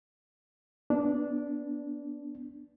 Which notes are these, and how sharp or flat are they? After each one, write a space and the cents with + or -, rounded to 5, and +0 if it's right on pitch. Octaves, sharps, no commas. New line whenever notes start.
B3 +0 D4 -10